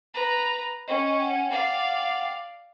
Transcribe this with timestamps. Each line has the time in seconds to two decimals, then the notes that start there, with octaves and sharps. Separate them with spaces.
0.14 B4 A#5
0.88 C#4 D#5 G5 C#6
1.22 F#5 G5
1.51 D5 F5